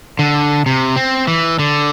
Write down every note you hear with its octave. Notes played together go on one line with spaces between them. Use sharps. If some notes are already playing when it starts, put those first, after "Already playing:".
D3
C3
C4
E3
D3